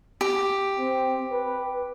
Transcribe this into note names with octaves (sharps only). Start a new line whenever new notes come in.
G4
C4
B4